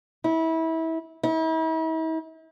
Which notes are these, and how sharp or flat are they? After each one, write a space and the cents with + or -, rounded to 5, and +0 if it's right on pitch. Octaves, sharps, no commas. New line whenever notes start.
E4 -25
E4 -45